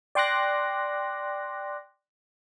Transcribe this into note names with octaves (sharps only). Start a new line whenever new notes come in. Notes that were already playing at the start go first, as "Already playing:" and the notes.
D5 G5 C6 D6 F#6 A#6